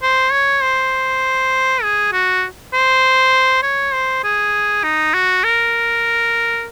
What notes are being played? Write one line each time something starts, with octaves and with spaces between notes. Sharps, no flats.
C5
C#5
C5
G#4
F#4
C5
C#5
C5
G#4
D#4
F#4
A#4